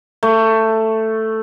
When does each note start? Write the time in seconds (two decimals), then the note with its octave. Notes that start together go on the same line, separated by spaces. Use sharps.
0.23 A3